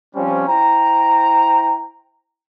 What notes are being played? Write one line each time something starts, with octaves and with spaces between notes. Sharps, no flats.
F3 G3 C4 C#4
E4 C5 G5 A#5